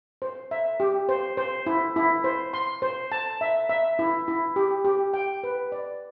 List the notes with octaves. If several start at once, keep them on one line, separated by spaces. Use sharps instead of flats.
C5
E5
G4
C5
C5
E4
E4
C5
C6
C5
A5
E5
E5
E4
E4
G4
G4
G5
B4
D5